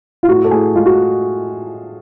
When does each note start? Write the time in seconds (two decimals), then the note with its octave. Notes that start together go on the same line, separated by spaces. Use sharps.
0.23 F4
0.29 A2 F#4
0.44 A4
0.51 A2 G#4
0.75 G#3 F4
0.86 F#4